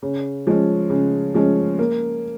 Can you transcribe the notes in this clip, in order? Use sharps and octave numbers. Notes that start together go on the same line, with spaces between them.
C#3
F3 G#3 C#4
C#3
F3 G#3 C#4
A#3